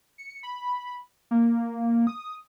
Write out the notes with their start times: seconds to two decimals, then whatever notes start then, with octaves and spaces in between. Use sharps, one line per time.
0.18 C#7
0.43 B5
1.31 A#3
2.07 D#6